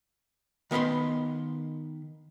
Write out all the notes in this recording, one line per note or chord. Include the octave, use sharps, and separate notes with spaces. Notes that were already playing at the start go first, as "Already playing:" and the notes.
D#3 B3 E5 B5 C6